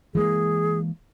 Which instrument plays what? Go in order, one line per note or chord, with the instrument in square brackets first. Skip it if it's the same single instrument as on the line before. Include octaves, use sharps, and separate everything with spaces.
[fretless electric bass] E3 G#3 A#3 [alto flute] G#4